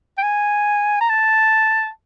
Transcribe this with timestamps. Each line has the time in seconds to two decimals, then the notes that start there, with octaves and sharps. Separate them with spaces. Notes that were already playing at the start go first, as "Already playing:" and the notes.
0.18 G5
0.23 G#5
1.01 A#5
1.10 A5